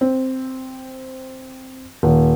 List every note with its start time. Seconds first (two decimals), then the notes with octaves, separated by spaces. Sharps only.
0.01 C4
2.03 D#1